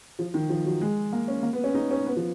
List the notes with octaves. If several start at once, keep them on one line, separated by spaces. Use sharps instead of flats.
F3
D#3
F3
F#3
G#3
A#3
C#4
A#3
B3
C#4
D#4
C#4
B3
F3